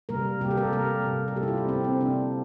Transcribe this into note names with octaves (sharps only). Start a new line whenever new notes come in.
C3 G3 A#3 A#4
C3 G3 A#3 G4
A4
A#4
C3 G3 A#3 A#4
C3 G3 A#3
A4
C3 G3 A#3 G4
E4
F4
C4
C3 G3 A#3 C4
C4
C3 G3 A#3 D4